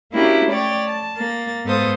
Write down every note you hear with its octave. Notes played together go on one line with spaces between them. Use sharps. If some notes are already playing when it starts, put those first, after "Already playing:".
A#3 C#4 D4 E4 F#4 G4
A3 C#5 D5 G5 A6
A5
A#3 A6
G#2 B3 A4 C5 F5 D#6